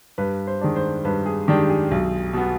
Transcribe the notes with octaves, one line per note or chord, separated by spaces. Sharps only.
G2 B4
C5
D#3 G#3 D4
C5
G2 B4
G#4
D#3 G#3 D4 G4
G#4
B1
B2 B3